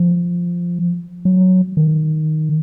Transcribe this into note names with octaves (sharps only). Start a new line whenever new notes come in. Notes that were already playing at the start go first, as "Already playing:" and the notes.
Already playing: F3
F#3
D#3